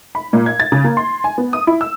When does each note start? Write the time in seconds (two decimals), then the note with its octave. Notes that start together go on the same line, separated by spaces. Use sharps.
0.15 B5
0.33 A#2
0.46 G#6
0.60 A6
0.72 C#3
0.84 A#3
0.97 C6
1.24 G#5
1.38 B3
1.53 D#6
1.67 E4
1.81 E6